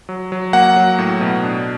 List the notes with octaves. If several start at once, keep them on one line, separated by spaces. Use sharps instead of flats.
F#3
F#3
A#3 F#5
F#3
A2
B2
D4